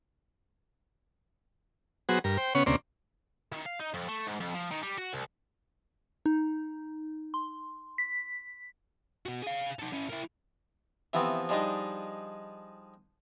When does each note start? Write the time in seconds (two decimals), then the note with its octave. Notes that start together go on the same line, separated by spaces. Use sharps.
2.09 F#3 B3 F#4 G#4 C5
2.24 G2 A#4
2.38 C5 G5
2.55 C#3 B3 C#4 C#5 F#5 C#6
2.66 D2 C3 A#3 C#4 D5 C6
3.52 D#3
3.66 F5
3.80 D#4
3.94 F2
4.09 A3
4.27 G#2
4.41 F2
4.54 F3
4.71 D#3
4.83 G3
4.98 F#4
5.13 C2
6.26 D#4
7.34 C6
7.98 B6
9.26 B2 F#4
9.42 G#4 F5
9.79 D#4 A4
9.93 C#4 E4
10.10 E4 A#4
11.13 C3 E3 F3 B3 C4
11.49 F3 G3 G#3 D4 D#4